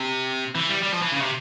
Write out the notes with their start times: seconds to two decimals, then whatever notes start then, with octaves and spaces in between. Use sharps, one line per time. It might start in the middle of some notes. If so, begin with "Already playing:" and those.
Already playing: C3
0.55 E3
0.69 G3
0.83 G3
0.92 F3
1.02 E3
1.12 C#3
1.22 C3